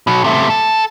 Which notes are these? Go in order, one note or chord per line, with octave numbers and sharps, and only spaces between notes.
B2 F#3
C3 A3
A4